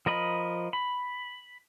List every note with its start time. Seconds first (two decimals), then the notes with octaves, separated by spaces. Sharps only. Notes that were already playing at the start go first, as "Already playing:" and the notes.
0.06 F3 A#4 D#5 B5
0.73 B5